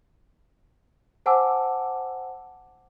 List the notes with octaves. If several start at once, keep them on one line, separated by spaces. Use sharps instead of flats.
C5 F#5 G#5 A5 D6 E6